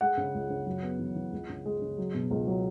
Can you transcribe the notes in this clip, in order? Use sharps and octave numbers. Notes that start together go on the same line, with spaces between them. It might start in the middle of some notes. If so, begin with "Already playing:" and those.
G#3 F#5
C#3
C#2
C#3
F#2
B3
E3
E3
C#2
C#3
G#3
C#3
F#3
B2
C#2
F#3